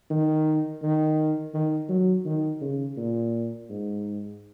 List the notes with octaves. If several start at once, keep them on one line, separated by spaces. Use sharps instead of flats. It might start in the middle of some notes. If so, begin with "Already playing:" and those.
D#3
D#3
D#3
F#3
D#3
C#3
A#2
G#2